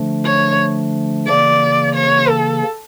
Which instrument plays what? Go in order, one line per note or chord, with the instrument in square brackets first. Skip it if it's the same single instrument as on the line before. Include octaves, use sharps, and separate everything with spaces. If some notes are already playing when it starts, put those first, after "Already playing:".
Already playing: [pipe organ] D3 F3 A3 D4
[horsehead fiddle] C#5
[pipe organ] C#3 E3 A#3 [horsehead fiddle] D5
[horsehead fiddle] C#5
A4